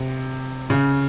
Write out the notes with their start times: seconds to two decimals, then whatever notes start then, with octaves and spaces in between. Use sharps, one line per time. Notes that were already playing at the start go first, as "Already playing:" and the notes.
Already playing: C3
0.70 C#3